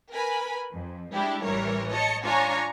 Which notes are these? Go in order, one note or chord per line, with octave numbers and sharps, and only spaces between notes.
A#4 B4 G#5 B5
F2
G#3 D4 E4 G4
A1 E3 G3 A#4 C#5
C#5 D#5 A5 C#7
D4 F4 C#5 G#5 A#5 C#6